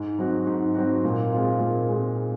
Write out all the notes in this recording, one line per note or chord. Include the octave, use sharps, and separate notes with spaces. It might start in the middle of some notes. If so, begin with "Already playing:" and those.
Already playing: G#2
F#3 C4 D#4 F#4
G#2
F#3 C4 D#4 F#4
A#2
G#3 C4 F4
A#2
G#3 C4 F4